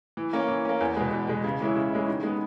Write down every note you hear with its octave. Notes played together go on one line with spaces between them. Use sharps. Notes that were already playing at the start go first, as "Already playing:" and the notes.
E3
A#3 C#4
E3
A#3 C#4
E2
B2 G#3
E2
B2 G#3
C#3
E3 G#3 C#4 E4
C#3
E3 G#3 C#4 E4
D#3
G#3 B3